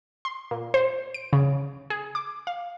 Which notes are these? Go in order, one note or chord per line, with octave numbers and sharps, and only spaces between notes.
C6
A#2
C5
D7
C#3
G#4
D6
F5